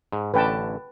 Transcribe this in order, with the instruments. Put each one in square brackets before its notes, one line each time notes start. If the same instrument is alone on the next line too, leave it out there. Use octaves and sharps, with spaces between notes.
[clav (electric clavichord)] G#2
[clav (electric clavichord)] A1 D3 C#4 [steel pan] B4 G5 A5